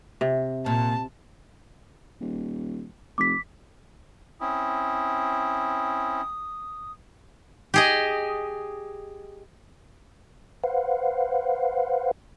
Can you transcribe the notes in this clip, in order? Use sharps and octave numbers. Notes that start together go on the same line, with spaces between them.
C3
A#2 A5
D#1
F1 D6 B6
C4 C#4 E4 D#6
G4 G#4 D#5
B4 C5 F5 F#5